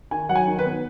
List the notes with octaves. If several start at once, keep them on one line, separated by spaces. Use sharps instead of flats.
D#3 G#5
F#3 F#5
G#5
D#3
B4
B3